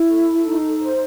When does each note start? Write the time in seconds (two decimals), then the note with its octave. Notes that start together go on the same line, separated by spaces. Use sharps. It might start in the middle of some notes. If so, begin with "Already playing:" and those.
Already playing: E4
0.09 A4
0.45 D#4
0.81 C5